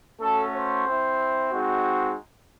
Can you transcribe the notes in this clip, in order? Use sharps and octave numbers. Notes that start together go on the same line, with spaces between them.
A3 C#4 F#4 A4
C5
C4 E4
G#3 C4 D#4 F#4